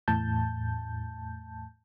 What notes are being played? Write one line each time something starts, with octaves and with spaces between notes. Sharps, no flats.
E2 A2 A5 G6